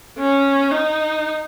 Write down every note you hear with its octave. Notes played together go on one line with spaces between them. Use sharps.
C#4
D#4